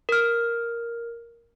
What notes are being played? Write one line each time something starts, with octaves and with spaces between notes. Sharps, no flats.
A#4 F6